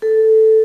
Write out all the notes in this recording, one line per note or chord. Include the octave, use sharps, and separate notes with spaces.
A4